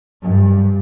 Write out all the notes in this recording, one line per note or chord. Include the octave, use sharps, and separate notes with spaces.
G2